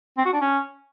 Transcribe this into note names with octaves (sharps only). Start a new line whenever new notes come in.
C4
F#4
D4
C#4